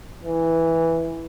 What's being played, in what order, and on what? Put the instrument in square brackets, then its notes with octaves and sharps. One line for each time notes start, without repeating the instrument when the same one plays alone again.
[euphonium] E3